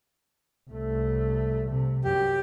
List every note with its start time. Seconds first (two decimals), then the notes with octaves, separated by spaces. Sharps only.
0.69 C2 A3
1.70 C3
2.04 F#2 G4